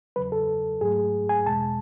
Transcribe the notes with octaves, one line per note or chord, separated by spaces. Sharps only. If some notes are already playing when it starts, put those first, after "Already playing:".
E2 C#3 F#3 B4
A4
G#2 F#3 A3 G#4
G#5
E2 B2 G#3 A5